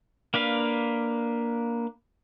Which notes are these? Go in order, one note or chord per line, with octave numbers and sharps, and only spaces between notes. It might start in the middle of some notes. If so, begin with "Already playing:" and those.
A#3 D4 B4 F5